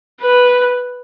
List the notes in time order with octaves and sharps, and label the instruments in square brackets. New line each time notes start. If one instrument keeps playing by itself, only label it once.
[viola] B4